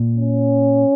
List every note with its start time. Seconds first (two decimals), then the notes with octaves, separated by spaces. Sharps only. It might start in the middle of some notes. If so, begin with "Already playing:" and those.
Already playing: A#2
0.15 C#4